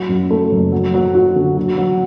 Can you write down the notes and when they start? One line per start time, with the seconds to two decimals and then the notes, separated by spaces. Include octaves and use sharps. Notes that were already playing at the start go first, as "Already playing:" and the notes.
Already playing: F#3
0.09 F#2
0.30 A3
0.51 F#1
0.72 F#3
0.94 F#3
1.14 F#4
1.36 D3
1.57 F#3
1.78 F#3